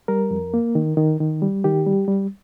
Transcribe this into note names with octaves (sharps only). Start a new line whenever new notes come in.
G3 A#4
F2
A#3
D#3
D#3
D#3
G3
D#3 G4
G3
G3